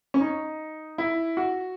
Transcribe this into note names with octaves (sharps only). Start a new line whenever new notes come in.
C#4
D#4
E4
F#4